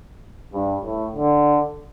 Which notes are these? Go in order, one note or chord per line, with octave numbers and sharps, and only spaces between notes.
G2
A2
D3